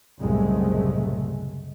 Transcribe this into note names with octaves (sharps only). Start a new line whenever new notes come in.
F#1 C2 A2 G#3 A3